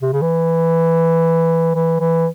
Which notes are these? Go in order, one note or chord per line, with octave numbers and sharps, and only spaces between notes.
C3
C#3
E3
E3
E3